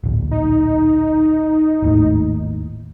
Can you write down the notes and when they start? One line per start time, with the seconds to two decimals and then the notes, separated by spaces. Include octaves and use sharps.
0.04 D1 A#1
0.31 D#4
1.82 G#1 D#2 A2